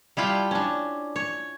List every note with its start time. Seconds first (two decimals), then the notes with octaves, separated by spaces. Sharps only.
0.17 G3 E4 F4 G5 A5
0.51 C#4 D4
1.16 C#5